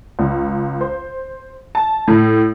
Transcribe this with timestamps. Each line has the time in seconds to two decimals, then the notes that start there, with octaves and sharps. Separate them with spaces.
0.19 C#2
0.81 C5
1.75 A5
2.08 A2